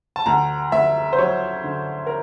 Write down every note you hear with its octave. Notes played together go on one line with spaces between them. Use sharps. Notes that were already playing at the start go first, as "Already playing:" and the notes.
A5
D2 A#5
D2 E5
C5
F#3 C#5
D3
A#4